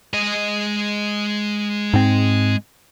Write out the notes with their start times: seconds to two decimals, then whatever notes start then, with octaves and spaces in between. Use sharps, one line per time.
0.14 G#3 D#5
1.94 G#2 C4